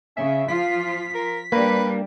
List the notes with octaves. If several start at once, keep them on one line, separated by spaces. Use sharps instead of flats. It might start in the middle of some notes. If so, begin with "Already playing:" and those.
C#3 C#4 E5
F3 F4 F5 B6
A#4
G3 A#3 D4 B4